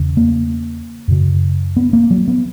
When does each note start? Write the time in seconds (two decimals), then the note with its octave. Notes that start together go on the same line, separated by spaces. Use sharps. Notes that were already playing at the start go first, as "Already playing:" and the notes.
Already playing: E2 C#3
0.17 A#3
1.08 F#2 C#3
1.77 B3
1.93 A#3
2.11 F#3
2.28 B3